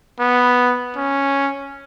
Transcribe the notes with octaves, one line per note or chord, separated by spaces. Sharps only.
B3
C#4